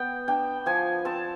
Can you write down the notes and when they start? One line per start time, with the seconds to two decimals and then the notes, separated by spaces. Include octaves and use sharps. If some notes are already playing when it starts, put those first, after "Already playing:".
Already playing: B3 G5
0.28 D4 G5
0.66 F3 G#5
1.05 C4 A5